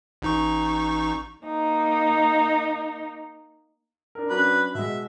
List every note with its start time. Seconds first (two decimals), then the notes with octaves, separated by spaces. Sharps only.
0.22 A1 D#4 C#6
1.45 A#3 D#4
4.15 D4 A#4
4.30 F#3 C#4 D4 B4
4.75 B2 G#3 E5